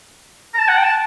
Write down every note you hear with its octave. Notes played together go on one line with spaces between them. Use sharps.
A#5
A5
F#5
G5
A5